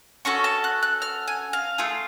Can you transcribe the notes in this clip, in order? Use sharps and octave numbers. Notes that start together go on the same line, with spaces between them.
C#4 F#4 A4 C#6
A5
F#6
F#6
F6
G#5
F5
A3 F4 G#4